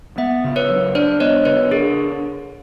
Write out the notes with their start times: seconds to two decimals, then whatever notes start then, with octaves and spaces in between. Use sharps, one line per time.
0.18 B3 E5 F#5
0.44 C#3
0.56 B4 C#5
0.70 F#3
0.95 D4 C5 D5
1.20 B3 C#5 D#5
1.45 C#3 B4 C#5
1.71 D4 G#4 A#4